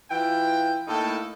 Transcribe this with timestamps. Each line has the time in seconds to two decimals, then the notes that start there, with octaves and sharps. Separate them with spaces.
0.10 E3 F4 G5
0.88 A2 A3 A#3 D#4 A4